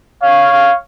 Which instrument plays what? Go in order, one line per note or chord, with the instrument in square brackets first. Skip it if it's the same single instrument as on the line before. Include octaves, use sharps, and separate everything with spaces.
[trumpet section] C#5 F5